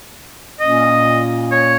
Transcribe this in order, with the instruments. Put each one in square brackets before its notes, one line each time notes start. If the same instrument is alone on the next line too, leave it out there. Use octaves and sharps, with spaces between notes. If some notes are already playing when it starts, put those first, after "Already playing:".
[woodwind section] A#2 A#3 C#4 [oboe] D#5
[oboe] C#5